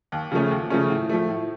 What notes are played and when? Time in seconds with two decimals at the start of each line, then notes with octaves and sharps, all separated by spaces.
0.12 D#2
0.32 C#3 F3 A3 C#4
0.51 D#2
0.70 C#3 F3 A3 C#4
0.90 A2
1.09 F3 A3
1.28 A2